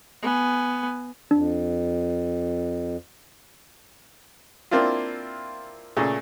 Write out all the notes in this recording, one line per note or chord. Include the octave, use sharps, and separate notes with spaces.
B3 G#5
F2 D4
A#3 C4 D4 E4 F4
A#2 C#3 A3 G#4